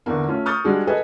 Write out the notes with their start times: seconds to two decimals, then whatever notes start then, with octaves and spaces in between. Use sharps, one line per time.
0.06 E2 D3 A#3
0.27 A3 C#4 F4
0.46 C#6 D#6 F6 G6 A6
0.64 G3 G#3 D4 F#4 G#4
0.87 G#4 A4 B4 D#5 G#5